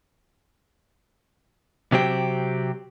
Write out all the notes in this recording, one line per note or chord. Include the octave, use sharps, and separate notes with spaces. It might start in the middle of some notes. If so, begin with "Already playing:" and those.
C3 F#3 C4 G4